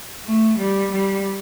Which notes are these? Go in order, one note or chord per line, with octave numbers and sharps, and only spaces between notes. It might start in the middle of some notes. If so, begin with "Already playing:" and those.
A3
G3
G3